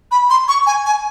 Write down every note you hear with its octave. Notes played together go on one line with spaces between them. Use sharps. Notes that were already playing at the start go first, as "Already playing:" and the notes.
B5
C6
C#6
G#5
G#5